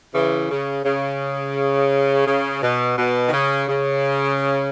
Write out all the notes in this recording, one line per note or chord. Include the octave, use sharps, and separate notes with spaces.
C#3 E3
C#3
C#3
C#3
B2
B2
D#3
C#3
C#3